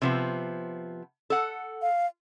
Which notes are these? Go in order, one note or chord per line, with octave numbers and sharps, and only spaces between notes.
C3 F3 B3
A4 F#5
F5